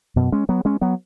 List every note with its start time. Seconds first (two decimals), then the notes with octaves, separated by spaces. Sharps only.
0.16 F#2 B2
0.32 G#3 C#4
0.49 F#3 B3
0.65 G#3 C#4
0.81 F#3 B3